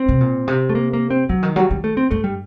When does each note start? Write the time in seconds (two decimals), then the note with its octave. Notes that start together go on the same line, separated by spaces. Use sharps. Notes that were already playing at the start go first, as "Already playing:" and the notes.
Already playing: C4
0.08 C3
0.20 A#2
0.48 C3
0.69 A3
0.75 A#3
0.93 A#3
1.10 C4
1.29 D3 F#3
1.43 D#3
1.56 F#3 G3
1.71 D#3
1.84 A3
1.97 C4
2.11 G2 A3
2.24 G3